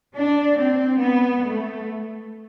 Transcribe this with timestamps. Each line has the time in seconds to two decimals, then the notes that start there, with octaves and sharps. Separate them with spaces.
0.16 D4
0.60 C4
1.02 B3
1.45 A3